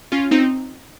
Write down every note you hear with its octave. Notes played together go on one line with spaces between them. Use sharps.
C#4 F4
C4 D#4